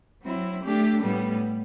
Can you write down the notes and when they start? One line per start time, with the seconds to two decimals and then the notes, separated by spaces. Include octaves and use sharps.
0.22 F#3 C4 E4
0.62 A3 D4 G4
1.02 A2 G3 B3